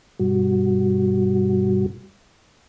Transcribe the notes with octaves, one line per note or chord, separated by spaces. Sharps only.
G2 B2 G3 F#4